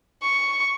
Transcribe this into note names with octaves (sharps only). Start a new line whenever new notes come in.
C#6